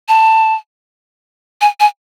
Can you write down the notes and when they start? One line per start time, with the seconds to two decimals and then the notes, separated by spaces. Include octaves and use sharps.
0.08 A5
1.61 G#5
1.80 G#5